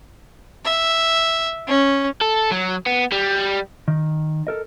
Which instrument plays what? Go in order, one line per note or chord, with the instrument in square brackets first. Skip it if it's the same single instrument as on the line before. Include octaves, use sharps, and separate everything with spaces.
[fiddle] E5
C#4
[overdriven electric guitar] A4
F#3
B3
G3
[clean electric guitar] D#3
A4 A#4 D#5